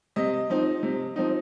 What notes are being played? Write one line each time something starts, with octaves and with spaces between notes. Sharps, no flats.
C3 D#5
F3 C4 D#4
C3
F3 C4 D#4